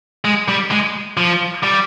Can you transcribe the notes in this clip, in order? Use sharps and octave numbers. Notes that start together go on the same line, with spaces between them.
G#3
G3
G#3
F3
G3